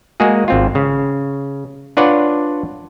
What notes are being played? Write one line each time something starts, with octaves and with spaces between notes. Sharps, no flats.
G#3 A#3 F#4 G#4
G#1 C4 F4
C#3
D4 F4 B4 C#5 D5 F#5